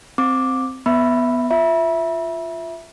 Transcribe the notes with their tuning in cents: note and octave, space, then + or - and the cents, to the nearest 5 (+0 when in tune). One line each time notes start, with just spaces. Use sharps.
C4 +0 D6 +0
B3 +0 E5 +0 B5 +0
F4 +0 E5 +0 B5 -35